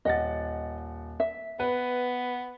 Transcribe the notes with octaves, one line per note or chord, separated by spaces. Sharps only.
D#1 D#5 F#5 A6
E5
B3 B4